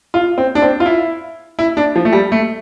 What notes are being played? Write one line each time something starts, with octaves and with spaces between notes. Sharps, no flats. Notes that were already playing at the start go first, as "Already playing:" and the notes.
F4
C4
D4
C4
F4
E4
E4
D4
F3
A3
G3
A3